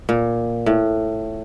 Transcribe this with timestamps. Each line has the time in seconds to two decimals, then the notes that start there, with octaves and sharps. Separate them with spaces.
0.09 A#2
0.66 A2